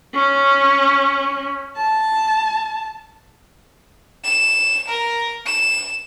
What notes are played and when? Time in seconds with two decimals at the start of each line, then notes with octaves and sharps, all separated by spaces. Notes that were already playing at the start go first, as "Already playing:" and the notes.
0.14 C#4
1.77 A5
4.24 E7
4.88 A#4
5.46 E7